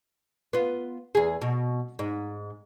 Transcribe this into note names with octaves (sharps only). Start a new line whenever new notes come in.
B3 F4
E2 G#4
B2
G#2